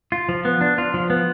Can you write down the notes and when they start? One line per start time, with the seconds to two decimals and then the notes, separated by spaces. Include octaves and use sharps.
0.12 F4
0.29 F3
0.45 B3
0.61 D4
0.78 F4
0.94 F3
1.10 B3